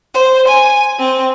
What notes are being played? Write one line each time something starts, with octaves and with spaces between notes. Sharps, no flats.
C5
G#5
C4